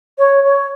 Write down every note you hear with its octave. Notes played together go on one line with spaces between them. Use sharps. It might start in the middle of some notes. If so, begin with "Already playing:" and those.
C#5
C#5